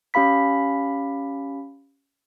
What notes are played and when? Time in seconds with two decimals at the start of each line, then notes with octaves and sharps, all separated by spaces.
0.14 C#4 G4 F5 B5 B6